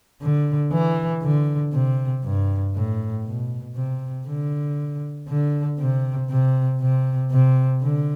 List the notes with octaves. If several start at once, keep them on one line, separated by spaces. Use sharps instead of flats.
D3
E3
D3
C3
G2
A2
B2
C3
D3
D3
C3
C3
C3
C3
D3